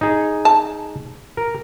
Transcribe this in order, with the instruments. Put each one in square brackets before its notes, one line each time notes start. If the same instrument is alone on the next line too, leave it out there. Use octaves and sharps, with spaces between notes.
[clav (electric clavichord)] D#4 G#4
[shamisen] A5
[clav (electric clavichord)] A#4